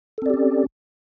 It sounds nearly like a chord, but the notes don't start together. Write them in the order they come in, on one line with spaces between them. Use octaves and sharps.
A4 C4 D5 G4 C#4